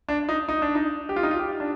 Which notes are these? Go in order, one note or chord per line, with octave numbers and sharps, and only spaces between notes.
D4
D#4
D#4
D4
D#4
G4
F4
D#4
F4
G4
D4